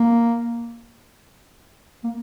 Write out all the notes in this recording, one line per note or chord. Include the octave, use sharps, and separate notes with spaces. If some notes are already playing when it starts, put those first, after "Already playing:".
Already playing: A#3
A#3